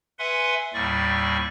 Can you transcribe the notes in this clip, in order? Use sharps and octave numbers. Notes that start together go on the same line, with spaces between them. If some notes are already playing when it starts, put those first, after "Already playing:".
B4 E5 F#5 G#5 C6
D#2 A2 G3 D5 C#6